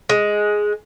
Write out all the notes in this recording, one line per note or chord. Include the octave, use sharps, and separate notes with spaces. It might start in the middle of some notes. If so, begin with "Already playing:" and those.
G#3